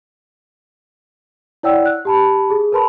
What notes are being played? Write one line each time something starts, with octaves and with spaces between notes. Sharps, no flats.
E4 C#5 D5 F#5 G5 E6
F#6
G4 A5 B5
G#4
A#4 B4 A5 B5 C6